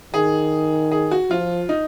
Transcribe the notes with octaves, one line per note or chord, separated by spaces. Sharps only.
D#3 G#4
G#4
F#4
F3 F4
D#4